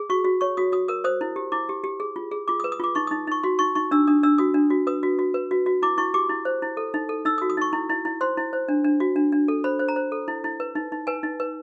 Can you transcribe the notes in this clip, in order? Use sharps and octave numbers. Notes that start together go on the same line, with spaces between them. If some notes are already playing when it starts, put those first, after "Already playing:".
Already playing: G#4
F#4 C#6
F#4
C#5 C#6
F#4 D#6
F#4 D#6
A#4 D#6
C5 D#6
E4
G4
E4 D6
G4
G4
G#4
F4
G#4
F4 D6
D#6
B4
D#6
F4 D6
D#4 C#6
D#6
D#4
D#4 C#6
F#4 C6
D#4 C#6
D#4 C#6
D4 E6
D4 D#6
D4 E6
F#4 D#6
D4
F#4
B4 D#6
F#4
F#4
B4
F#4
F#4
E4 D6
E4 C#6
G4 D6
E4
C5
E4
A4
D#4
A4
D#4 E6
D#6
F#4
D#6
D#4 C#6
E4
E4
E4
C5 C6
E4
C5
D4
D4
F#4
D4
D4
A4
C5 B5
C5
A#5
C5
A4
E4
E4
B4
D#4
D#4
B4 G#5
D#4
B4